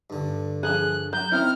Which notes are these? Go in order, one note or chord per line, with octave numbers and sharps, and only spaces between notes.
G2 D3
F3 F#3 G#4 F#6
F#3 G6
D#3 C4 E4 F6